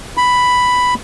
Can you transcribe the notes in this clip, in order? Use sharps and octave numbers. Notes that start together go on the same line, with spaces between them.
B5